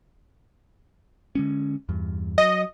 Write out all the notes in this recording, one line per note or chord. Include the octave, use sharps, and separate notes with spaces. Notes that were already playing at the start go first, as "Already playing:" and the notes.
D3 G#3 C#4
E2 G2
F#3 D#5